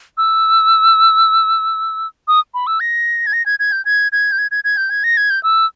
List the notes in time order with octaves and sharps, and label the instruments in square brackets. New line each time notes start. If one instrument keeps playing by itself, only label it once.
[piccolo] E6
D#6
B5
E6
A#6
G#6
A#6
G#6
G#6
G6
G#6
G#6
G6
G#6
G#6
G#6
G6
G#6
A#6
G#6
G6
E6